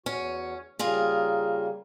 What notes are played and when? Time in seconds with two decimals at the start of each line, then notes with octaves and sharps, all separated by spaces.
0.06 E2 C#4 F#4
0.79 C#3 G3 A#3 F4 G#4 A#4